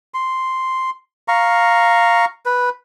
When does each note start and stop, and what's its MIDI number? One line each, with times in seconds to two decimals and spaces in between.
0.14 0.90 84
1.28 2.25 77
1.28 2.25 82
1.28 2.25 85
2.46 2.69 71